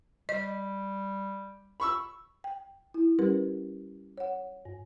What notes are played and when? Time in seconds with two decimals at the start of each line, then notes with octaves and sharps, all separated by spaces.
0.29 G3 D#5
1.80 B5 C#6 E6
2.44 G5
2.94 E4
3.19 G3 C#4 G4 A#4 B4
4.18 C#5 F#5
4.65 G2